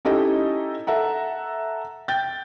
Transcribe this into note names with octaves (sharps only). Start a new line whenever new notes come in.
C#4 D#4 E4 G4 A4 D#5
A4 E5 F#5 A#5
G5 G6 A6